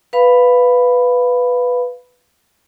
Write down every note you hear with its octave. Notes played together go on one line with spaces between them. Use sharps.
B4 F5 B5